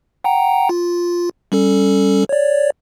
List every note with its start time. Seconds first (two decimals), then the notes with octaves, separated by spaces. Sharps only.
0.24 F#5 G5 A#5
0.69 F4
1.52 G3 C#4 A4
2.29 C#5 D5